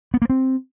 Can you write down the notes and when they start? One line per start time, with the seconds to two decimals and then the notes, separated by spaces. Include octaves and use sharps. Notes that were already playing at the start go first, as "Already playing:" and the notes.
0.14 B3
0.22 A#3
0.30 C4